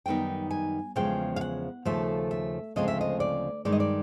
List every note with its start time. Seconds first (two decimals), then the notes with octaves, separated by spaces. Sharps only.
0.06 F#2 D#3 G3 B3 D#4 G5
0.51 G#5
0.96 E2 C#3 F3 G#3 G5
1.36 F5
1.41 F#5
1.85 D#2 C#3 F3 A3 E5
2.31 E5
2.76 D2 C#3 F3 G#3 C4 D#5
2.88 E5
3.01 D#5
3.20 D5
3.65 G2 D#3 G#3 D5
3.72 D#5
3.80 D5